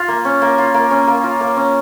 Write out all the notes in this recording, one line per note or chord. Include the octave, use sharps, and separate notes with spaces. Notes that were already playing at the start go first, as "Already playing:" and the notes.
Already playing: F4
A#3
C#4
A#3
F4
A#3
C#4
A#3
F4
A#3
C#4